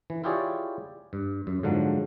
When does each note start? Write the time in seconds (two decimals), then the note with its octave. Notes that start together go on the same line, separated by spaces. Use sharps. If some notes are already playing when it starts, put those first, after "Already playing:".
0.10 E3
0.24 E4 F4 G4 G#4 C#5 D5
1.13 G2
1.47 F#2
1.63 G#2 D3 F3 F#3